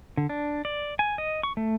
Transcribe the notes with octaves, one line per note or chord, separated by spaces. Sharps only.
D3
D4
D5
G#5
D#5
C#6
A3